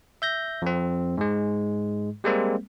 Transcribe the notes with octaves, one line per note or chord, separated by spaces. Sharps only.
E5 G6 A#6
F2 C4
G#2 G#3
G3 G#3 A#3 C4